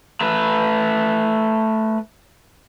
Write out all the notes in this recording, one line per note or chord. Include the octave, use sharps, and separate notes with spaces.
A3 B4